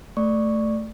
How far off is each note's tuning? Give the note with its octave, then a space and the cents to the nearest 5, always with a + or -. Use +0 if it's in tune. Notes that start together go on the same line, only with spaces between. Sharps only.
A3 +0 D5 +5 C#6 +0